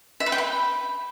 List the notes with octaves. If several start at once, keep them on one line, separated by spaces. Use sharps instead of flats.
E5
B4
G5
B5